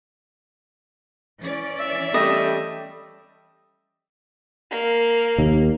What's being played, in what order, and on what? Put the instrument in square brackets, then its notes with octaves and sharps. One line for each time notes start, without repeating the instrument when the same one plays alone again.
[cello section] E3 C#4 D5
[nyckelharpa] E5
[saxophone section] G3 A3 [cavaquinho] D#5
[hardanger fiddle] A#3
[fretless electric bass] D#2